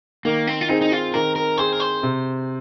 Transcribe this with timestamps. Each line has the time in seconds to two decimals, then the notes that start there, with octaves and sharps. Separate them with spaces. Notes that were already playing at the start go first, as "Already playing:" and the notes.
0.25 D#3 A#3
0.47 C4
0.61 F4
0.69 C4 D#4 G#4
0.81 D#4
0.92 F4
1.14 D#3 A#4
1.36 A#4
1.58 C4 G#4 C5
1.73 A#4
1.80 C5
2.03 C3